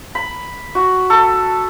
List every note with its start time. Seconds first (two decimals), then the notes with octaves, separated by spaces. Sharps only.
0.15 B5
0.75 F#4
1.10 A4